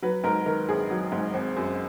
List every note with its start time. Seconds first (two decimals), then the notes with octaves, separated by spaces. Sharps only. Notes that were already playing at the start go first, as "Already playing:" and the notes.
0.02 F#3 B4
0.24 G#2 A#4
0.46 D#3 A#4
0.69 A#1 G#4
0.91 F#3
1.12 G#2
1.34 G#1
1.56 F#2